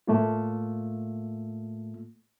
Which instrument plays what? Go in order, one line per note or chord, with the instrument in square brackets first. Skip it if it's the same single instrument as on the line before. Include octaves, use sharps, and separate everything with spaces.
[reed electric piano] A2 A3 A#3 F4